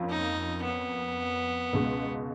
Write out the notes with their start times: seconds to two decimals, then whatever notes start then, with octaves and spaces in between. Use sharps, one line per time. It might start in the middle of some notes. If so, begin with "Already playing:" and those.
Already playing: F2 A#3 C#4 F4
0.10 D#4
0.64 B3
1.73 C#2 B2 G#3